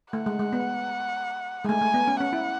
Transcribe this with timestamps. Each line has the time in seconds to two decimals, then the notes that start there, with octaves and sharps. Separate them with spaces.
0.13 A3 F#5
0.26 G#3
0.39 G#3
0.53 B3
1.65 G#3
1.68 A3 G#5
1.81 A3
1.94 B3
2.07 C#4
2.20 C#4 F#5
2.33 E4